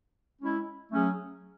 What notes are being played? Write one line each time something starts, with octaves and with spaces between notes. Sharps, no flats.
G#3 C#4 E4
F#3 A3 C#4 G#4